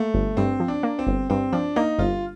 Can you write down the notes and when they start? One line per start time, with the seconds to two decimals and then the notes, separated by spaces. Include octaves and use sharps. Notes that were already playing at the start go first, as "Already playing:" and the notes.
Already playing: A3 A#3
0.14 G1
0.37 G2 C4
0.60 F3
0.68 D4
0.83 A#3
0.99 C4
1.07 G1
1.30 G2 C4
1.53 F3 D4
1.76 A#3 D#4
1.99 G1 F4